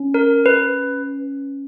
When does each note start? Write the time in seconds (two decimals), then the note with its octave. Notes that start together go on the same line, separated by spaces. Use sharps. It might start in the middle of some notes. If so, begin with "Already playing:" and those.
Already playing: C#4
0.14 A#4
0.46 B4